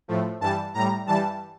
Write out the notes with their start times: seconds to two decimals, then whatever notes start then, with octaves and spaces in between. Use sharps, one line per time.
0.08 A2 F3 A3
0.40 G2 E3 G3 A5
0.74 A2 G3 A#5
1.06 G2 E3 G3 A5